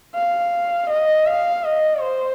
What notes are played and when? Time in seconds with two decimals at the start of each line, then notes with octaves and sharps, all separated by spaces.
0.15 F5
0.90 D#5
1.26 F5
1.64 D#5
2.01 C5